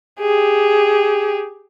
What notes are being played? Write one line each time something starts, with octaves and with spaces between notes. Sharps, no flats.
G4 G#4